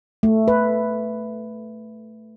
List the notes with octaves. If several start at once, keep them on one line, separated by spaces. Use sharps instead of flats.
A3
B4